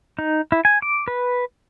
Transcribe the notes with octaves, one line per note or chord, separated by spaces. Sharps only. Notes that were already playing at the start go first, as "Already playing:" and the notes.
D#4
E4
G#5
D6
B4